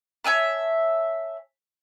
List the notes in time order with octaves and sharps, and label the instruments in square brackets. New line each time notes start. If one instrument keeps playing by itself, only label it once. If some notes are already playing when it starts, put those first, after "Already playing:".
[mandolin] C#5 E5 G#5 A5